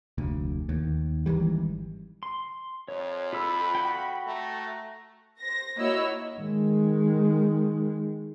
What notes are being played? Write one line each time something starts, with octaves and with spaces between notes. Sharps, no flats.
F1 D2
D#2
G#1 D#3 E3 G3
C6
F2 C#5
F4 A4 B5 E6
F#4 F#5 G5
A3 A#5
C5 A#6
A#3 E4 F#4 C#5 D#5 E6
D#3 G#3